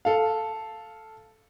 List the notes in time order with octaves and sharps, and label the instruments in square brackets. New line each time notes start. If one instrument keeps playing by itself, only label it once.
[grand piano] A4 F5